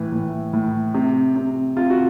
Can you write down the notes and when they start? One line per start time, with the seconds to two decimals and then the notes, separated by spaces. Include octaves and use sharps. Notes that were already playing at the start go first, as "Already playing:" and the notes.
Already playing: A2 E3
0.12 A2
0.53 A2
0.94 C3
1.36 C3
1.77 C3 F4
1.90 F#4